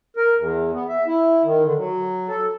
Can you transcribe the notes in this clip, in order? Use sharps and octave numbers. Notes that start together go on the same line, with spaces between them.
A#4
E2
B3
E5
E4
D#3
D3
F#3
A4